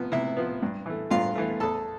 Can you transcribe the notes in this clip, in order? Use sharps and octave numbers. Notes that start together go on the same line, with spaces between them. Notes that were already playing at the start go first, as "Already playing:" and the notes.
Already playing: C3 F3 B3
C3 E4 E5
F3 B3
G2
E3 A3
G2 F4 F5
E3 A3
E2 A4 A5